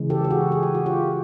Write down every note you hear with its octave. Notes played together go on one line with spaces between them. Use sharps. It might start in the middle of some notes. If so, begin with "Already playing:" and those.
Already playing: C#3 E3 G#3
G4 A4
G4
F#4 G#4
G#4
G4
F#4
F4 G4